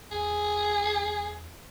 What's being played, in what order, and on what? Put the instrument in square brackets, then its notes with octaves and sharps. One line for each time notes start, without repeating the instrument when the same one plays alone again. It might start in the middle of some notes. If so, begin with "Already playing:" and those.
[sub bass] E2 [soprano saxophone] G#4